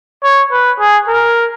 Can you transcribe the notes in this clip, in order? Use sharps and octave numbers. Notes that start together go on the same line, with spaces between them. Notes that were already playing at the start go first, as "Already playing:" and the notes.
C#5
B4
G#4
A#4